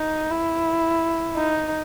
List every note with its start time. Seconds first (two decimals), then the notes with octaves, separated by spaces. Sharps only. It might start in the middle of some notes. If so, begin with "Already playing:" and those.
Already playing: D#4
0.31 E4
1.36 D#4